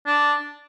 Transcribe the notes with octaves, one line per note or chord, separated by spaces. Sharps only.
D4